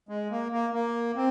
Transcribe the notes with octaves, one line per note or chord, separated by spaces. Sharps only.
G#3
A#3
A#3
A#3
C4